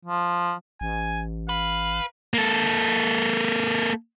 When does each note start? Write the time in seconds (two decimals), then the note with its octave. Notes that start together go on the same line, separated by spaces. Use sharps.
0.05 F3
0.81 A1 G#5
1.49 B4 F5
2.34 A#3 A4